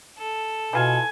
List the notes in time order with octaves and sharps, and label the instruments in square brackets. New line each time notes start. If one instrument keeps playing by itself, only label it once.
[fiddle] A4
[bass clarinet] B2 [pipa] E3 F4 A5 [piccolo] G#5